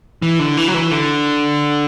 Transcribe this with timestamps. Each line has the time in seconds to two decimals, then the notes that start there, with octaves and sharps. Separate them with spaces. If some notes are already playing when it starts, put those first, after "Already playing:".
0.22 E3
0.39 D3
0.57 E3
0.68 F#3
0.74 E3
0.91 D3